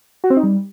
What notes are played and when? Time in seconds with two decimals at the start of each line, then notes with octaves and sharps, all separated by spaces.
0.24 F#4
0.30 C4
0.37 D#4
0.43 G3